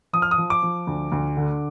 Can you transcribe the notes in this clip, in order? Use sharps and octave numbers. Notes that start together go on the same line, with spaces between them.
F3 D#6
F6
D#6
F3
D6
F3
D2
D2
D3